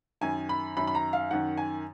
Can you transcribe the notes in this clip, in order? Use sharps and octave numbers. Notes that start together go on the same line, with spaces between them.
F#2 D#3 G#5
B5
F#2 D#3 B5
B5
A#5
F5
F#2 D#3 F#5
G#5